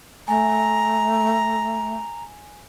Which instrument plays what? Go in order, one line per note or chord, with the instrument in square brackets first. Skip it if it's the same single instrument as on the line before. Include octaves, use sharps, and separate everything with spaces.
[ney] A3 [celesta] G#5 [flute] A#5